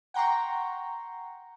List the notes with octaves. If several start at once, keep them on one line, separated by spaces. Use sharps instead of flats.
F#5 G5 A#5 C6 C#6